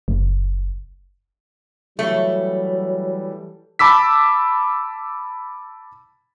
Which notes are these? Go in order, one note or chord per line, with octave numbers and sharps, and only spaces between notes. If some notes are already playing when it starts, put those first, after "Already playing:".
F#1
E3 F#3 G3 A3
A5 B5 D6 E6 B6